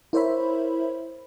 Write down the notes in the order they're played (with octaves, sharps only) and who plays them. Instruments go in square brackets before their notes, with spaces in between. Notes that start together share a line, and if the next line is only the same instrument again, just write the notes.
[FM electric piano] E4 A#4 C5 C#5 E5 B5